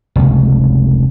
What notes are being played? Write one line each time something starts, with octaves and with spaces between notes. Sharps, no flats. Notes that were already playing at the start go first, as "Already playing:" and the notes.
F1 C#2